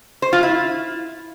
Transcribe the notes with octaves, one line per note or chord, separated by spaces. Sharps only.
C5
F4
E4